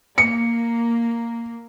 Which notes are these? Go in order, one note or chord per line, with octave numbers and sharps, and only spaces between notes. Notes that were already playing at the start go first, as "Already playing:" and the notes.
A#3 C#7